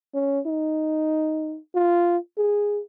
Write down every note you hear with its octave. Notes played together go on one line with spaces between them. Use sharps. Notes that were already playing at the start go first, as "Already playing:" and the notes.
C#4
D#4
F4
G#4